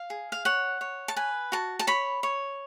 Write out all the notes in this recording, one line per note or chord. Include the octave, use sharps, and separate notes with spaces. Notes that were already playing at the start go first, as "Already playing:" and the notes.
Already playing: F5
G#4
F5
C#5 F#5
C#5
A5
B4 G#5
F#4 A5
A5
C#5 B5
C#5